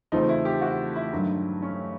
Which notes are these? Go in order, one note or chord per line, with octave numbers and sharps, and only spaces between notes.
E2 C#3 F3 A3 C4 D#4
E4
G4
F#4
E4
G2 D#3 F#3 A3
C#4